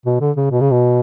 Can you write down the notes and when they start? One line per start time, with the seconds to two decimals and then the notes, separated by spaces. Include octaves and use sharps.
0.06 B2
0.21 D3
0.37 C#3
0.52 B2
0.61 C#3
0.71 B2